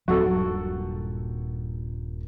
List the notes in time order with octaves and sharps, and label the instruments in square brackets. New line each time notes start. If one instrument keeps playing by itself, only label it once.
[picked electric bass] D#1 G2 A#2 [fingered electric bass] F#3 [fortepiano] F#4 A4